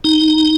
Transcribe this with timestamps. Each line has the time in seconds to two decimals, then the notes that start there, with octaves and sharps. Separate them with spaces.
0.04 D#4